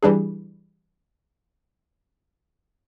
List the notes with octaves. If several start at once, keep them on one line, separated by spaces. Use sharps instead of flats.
E3 G3 D4 G#4